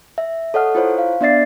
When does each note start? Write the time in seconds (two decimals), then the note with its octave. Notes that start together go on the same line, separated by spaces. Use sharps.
0.18 E5
0.54 A4 C#5 D#5 F#5 F6
0.75 E4 F4 C5 C#5
0.98 F5
1.21 B3 D4 D5 E5 A6 C7